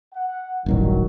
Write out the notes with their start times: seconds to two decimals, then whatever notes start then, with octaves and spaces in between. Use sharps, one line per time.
0.14 F#5
0.66 D#1 A1 G2 D#3 F#3